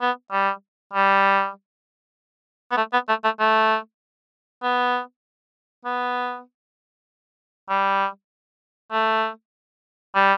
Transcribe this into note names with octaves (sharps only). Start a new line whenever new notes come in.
B3
G3
G3
B3
A3
B3
A3
A3
A3
B3
B3
G3
A3
G3